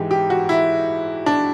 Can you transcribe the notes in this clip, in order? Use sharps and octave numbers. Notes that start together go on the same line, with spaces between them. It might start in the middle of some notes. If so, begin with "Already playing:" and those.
Already playing: G#2 E3 G#3 G4
G4
F#4
E4
D4